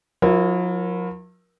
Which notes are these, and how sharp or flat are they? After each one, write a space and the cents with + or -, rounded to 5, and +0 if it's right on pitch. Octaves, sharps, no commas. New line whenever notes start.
F#3 -45 E4 +15 A#4 +20